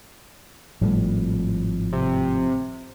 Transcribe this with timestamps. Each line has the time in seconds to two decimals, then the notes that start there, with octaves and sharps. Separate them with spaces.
0.81 G#1 A2 F3 G3 A3
1.92 C3